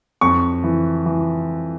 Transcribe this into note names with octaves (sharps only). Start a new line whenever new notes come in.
F2 C#6
E3
E3